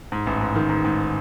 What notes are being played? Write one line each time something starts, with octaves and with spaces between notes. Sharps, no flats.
G#2
A1
G#2
D#3
G#2
G#2